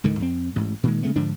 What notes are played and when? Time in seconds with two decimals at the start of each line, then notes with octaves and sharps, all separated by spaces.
0.04 C#2 G#2 D3 D#3
0.19 F2 C4
0.56 A1 G#2
0.83 A#2 D#3 G#3
1.03 C#3 G#3 A3 B3
1.16 G#2 D3 F3 D4